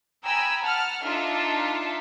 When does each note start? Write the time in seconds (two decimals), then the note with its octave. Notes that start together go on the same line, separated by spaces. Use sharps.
0.24 G5 G#5 A#5 B5 D#6 E6
0.62 F#5 A5 F6
1.03 D4 D#4 F4 A4 E5 A5